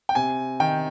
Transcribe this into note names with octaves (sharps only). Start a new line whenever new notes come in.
G5
C3 G#5
D#3 G5